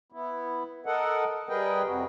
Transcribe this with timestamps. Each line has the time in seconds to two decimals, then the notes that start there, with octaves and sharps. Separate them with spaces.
0.12 B3 E4
0.86 A4 A#4 D#5 F#5
1.49 G3 G#4 A#4 B4 D#5 G5
1.86 F2 C3 F#4